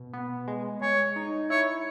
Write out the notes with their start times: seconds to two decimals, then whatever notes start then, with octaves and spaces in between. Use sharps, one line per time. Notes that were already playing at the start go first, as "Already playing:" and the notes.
Already playing: B2
0.14 B3
0.48 G#3
0.82 G#3 C#5
1.16 D#4
1.50 E4 C#5